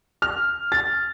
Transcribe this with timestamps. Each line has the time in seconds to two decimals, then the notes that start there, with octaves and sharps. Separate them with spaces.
0.22 F6
0.72 A6